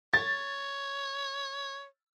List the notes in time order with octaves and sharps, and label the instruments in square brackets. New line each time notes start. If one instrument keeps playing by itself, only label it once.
[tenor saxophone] C#5 [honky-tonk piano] A6